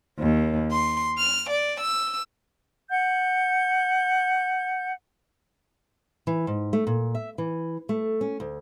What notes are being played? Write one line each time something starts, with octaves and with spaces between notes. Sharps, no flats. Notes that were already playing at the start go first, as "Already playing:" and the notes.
D#2
C6
F6
D5
E6
F#5 G6
E3
G#2
A3
A#2
E5
E3
A3
C#4
D2